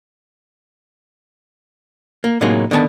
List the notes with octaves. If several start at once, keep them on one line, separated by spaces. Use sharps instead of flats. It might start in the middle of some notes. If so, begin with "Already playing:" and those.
A#3
A2 C3 F#3 G#3 A#3 D#4
D3 D#3 B3 G#5 A5